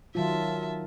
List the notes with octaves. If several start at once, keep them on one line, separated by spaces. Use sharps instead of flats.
D#3 F#3 F4 E5 A5